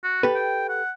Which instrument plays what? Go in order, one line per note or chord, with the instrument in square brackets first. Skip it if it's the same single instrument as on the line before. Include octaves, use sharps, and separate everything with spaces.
[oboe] F#4
[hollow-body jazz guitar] G4 A4 B4
[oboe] G5
F#5